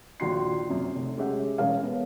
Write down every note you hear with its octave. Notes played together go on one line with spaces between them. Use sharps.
A#1 D#2 F4 F#4 C6 C7
F#2 C3
F1
G#3 C#4 G4 E5 F#5
E1 C#3 G#4 A#4 C#5 F5
B3